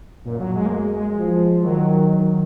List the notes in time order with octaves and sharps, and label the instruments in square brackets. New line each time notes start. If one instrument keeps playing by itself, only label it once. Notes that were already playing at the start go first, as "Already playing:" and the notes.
[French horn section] F#2 [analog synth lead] A#2
[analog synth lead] F#3
G#3
A#3
G#3
G#3
[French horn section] F3
[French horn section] D#3 [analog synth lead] F#3
[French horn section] D#3